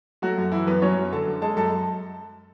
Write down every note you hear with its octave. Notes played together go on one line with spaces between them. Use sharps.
F#3 A3 F#4
F#2
E3 E4
F#2 B3 B4
F#3 C#4 C#5
F#2
D3 A4 A5
F#2
G#3 A4 A5
F#2 A4 A5